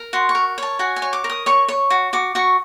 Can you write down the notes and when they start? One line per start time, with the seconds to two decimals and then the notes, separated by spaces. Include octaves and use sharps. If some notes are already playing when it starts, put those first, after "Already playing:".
Already playing: A#4
0.13 F#4 C6
0.29 C#6
0.35 A#4
0.58 C#5 A5
0.79 F#4 G#5
0.96 G#5
1.02 C#5
1.13 D6
1.24 A#4
1.30 D#6
1.46 C#5 C#6
1.68 C#5
1.90 F#4
2.13 F#4 D6
2.35 F#4 C#6